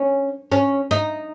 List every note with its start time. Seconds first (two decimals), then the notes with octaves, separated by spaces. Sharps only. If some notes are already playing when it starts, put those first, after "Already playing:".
Already playing: C#4
0.52 C#4
0.91 D#4